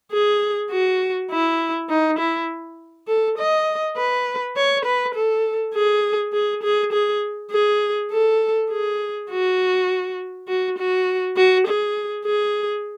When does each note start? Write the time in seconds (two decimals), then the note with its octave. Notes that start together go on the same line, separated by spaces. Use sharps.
0.12 G#4
0.71 F#4
1.31 E4
1.90 D#4
2.18 E4
3.08 A4
3.38 D#5
3.97 B4
4.57 C#5
4.85 B4
5.15 A4
5.74 G#4
6.33 G#4
6.63 G#4
6.92 G#4
7.51 G#4
8.11 A4
8.71 G#4
9.30 F#4
10.48 F#4
10.78 F#4
11.36 F#4
11.67 G#4
12.25 G#4